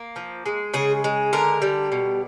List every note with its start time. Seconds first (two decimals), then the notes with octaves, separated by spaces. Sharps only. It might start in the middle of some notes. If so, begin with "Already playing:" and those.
Already playing: A#3
0.16 F3
0.46 G#3
0.74 C#3 G#4
1.04 G#3
1.33 D3 A#4
1.62 G3
1.92 B2